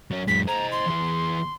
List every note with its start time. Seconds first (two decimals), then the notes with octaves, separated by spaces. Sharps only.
0.11 F#3 C#4
0.28 F#2 G#3 B6
0.48 C5 D#5 A#5
0.71 C6
0.86 E2 G#4